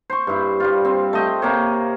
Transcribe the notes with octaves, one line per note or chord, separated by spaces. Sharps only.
C5 C#6
G2 E4
G3 F4
C4
A3 D#5 G5
C3 A#3 C#5